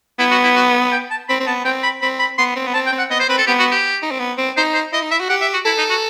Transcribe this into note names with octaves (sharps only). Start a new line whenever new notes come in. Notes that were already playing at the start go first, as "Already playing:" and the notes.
B3 E4
F#4
E4
F#4
G5
A5
C4 B5
C4
B3 A5
C4 G5
B5
C4 B5
B5
B3 C6
C4
B3
C4 A5
G5
C4
F#5
B3 D#5
C5
C4 B4
A4
B3 G4
F#4
G4
D#4
C4
B3
C4
D#4 C5
C5
E4 D#5
D#4
E4 E5
F#4
G4 F#5
E5
F#4
E4 A4
D#4
F#4